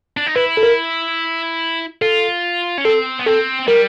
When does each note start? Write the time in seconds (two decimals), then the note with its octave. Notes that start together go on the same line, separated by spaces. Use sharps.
0.17 D4
0.26 D#4
0.35 E4 B4
0.57 A4
0.63 A#4
2.01 F4 A4
2.78 C#4
2.85 C4 A4
3.19 B3
3.27 C4 A4
3.68 G3 A#4